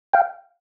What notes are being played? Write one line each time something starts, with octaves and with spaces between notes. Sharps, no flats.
F5 G5